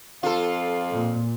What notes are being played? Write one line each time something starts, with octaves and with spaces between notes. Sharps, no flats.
F2 F4 A4 F5
A#2